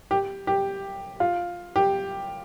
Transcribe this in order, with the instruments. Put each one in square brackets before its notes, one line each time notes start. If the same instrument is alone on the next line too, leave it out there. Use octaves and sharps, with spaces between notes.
[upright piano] G4
G4
F4
G4